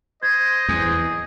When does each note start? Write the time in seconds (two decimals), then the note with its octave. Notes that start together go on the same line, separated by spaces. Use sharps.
0.23 C5 D#5 G#6
0.69 E2 G#4